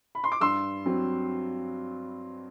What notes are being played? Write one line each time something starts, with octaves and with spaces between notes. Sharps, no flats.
B5
C6
D6
G2 C6 E6
F#3 C4